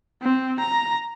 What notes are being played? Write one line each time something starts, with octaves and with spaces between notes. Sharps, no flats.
C4
A#5